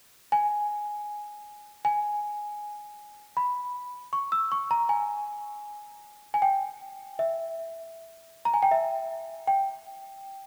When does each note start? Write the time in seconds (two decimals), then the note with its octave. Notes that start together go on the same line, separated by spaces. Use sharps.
0.32 G#5
1.85 G#5
3.37 B5
4.13 C#6
4.32 E6
4.52 C#6
4.71 A#5
4.89 G#5
6.34 G#5
6.42 G5
7.19 E5
8.45 A#5
8.54 G#5
8.63 G5
8.71 E5
9.48 G5